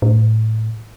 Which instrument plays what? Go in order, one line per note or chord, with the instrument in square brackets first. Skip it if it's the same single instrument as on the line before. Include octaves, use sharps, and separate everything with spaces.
[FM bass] A2